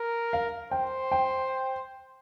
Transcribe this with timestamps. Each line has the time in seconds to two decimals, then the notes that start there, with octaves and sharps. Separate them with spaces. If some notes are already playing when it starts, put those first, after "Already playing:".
Already playing: A#4
0.33 F5
0.71 C5 G5
1.12 G5